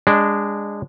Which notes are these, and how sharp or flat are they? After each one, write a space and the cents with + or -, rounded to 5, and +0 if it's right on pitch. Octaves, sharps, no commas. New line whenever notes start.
G#3 -20 D4 -5